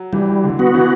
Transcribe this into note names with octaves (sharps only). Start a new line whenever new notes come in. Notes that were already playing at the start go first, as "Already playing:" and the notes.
Already playing: F#3
E3 G3
D3
B3 F#4
E3